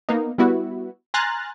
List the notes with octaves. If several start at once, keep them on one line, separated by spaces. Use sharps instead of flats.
A#3 B3 D#4
G3 B3 E4 F#4
G#5 A#5 C6 F6 F#6 A6